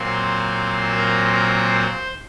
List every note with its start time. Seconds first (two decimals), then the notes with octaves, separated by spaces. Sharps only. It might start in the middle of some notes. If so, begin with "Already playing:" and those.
Already playing: A#2 F#3 C4 C5
0.96 A#4
1.33 A#4
1.69 C5